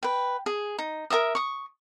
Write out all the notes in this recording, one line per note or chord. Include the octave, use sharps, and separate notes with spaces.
B4 G5
G#4
D#4
A#4 D#5 E5 D#6
C#6 D#6